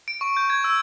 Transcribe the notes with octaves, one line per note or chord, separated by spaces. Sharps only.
D7
C#6
G6
G#6
E6